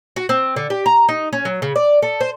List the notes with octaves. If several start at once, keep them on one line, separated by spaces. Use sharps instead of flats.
F#4
C4
D3
G4
A#5
D#4
C#4
F#3
C#3
D5
A4
C5